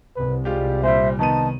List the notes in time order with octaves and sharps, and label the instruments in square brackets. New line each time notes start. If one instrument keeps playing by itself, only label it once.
[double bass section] C2 [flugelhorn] B4
[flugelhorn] G3 [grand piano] G#3 F4 G4
[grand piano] A#2 G3 [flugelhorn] C5 [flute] E5
[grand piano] D#3 B3 D#7 [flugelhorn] D#4 [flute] A5